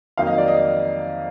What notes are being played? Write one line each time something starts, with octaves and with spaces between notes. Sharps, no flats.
F2 D#3 F#3 A#3 D#4 F5
D#5
D5
D#5